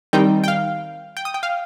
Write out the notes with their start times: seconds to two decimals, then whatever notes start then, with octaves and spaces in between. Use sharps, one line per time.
0.13 D#3 G3 C4 D#4 G5
0.44 G5
0.48 F5
1.17 G5
1.25 D#6
1.34 G5
1.43 F5